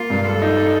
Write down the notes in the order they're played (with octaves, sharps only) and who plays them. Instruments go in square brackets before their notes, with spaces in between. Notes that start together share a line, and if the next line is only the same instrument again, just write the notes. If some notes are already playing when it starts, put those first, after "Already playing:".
Already playing: [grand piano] A#3 [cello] F4
[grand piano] G2
[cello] A4
[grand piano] D#4